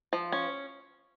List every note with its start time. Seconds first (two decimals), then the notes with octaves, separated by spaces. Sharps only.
0.13 F3
0.32 C#4